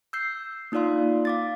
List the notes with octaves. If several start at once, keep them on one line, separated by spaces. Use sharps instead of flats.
E6 G6 C7
A#3 D#4 F4 D5 F5 C6
F5 D6 A6